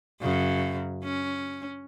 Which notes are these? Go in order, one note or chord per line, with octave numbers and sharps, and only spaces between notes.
F#2 C#3
C#4